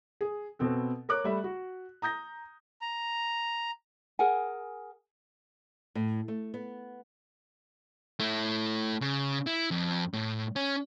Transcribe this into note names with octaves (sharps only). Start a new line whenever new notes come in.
G#4
B2 B3 C4 A4
A#4 C#5 D6 F#6
G3 A3 E5 B5
F#4
A#5 D#6 G6 A#6
A#5
G#4 A#4 F#5 G#5
A2
A3
B3
A3 E4
C#3
E4
F2
A2
C#4